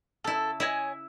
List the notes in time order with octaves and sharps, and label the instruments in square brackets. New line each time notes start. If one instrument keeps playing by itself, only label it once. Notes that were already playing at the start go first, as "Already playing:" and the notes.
[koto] C#3 E4 [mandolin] A4
[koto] E4 [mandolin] C#5 D#5 G#5